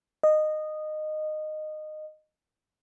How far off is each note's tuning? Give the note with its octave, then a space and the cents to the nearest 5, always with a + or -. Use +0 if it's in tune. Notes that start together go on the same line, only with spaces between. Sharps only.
D#5 -15